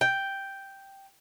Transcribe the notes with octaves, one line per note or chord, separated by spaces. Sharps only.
G5